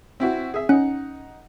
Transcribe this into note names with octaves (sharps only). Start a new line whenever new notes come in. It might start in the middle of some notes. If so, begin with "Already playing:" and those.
C4 E4 F#4
G#4 E5
C#4 D#4 F#5